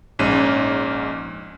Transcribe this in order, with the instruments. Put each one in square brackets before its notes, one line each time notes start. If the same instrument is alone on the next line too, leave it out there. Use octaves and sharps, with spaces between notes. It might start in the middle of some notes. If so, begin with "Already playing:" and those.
[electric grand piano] A#1 G#2 C#4 D#7